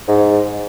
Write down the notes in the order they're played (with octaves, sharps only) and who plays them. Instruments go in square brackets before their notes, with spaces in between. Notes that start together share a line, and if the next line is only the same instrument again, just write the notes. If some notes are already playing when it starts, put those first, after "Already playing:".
[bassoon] G#2